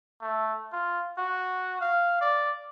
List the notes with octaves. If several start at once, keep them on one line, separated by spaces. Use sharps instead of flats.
A3
F4
F#4
F5
D5